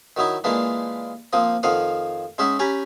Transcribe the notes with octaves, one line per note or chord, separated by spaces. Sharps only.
D#3 F#3 D#4 E4
A#2 E3 G#3 A#3 D4
F3 A#3 C4 D#6
F2 D#3 F3 F5 F#5 D#6
G#3 C#4 D#4 E5 F#5
C#4 G4 G#5 A#5 B5